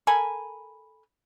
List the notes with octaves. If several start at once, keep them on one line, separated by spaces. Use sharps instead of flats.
A4 A#4 G#5 B5